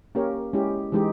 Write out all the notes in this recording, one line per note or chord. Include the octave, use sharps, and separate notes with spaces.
A#3 C#4 G4 A#4 C#5
G#3 C#4 E4 G4
E3 G#3 D#4 G4